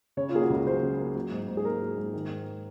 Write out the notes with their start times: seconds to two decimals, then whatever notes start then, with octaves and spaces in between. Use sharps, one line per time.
0.17 C#3 C#5
0.29 F4
0.34 A#3 G#4
0.42 F#4
0.50 C#2 A#4
0.66 F#3 C5
0.83 C#3
0.99 A#3
1.16 F#3
1.31 G#2
1.48 G#2
1.57 G#4
1.65 A#3 A#4
1.81 F#3
1.98 G#2
2.13 D#3
2.30 G#2